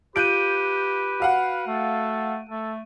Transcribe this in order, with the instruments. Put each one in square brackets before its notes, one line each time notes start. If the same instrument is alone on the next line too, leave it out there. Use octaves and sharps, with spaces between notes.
[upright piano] F4 F#6 G6 [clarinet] G4 [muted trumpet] B4 [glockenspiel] D7 D#7
[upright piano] F#4 F5 F#5
[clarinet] A3 [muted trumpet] A4
[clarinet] A3 [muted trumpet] A4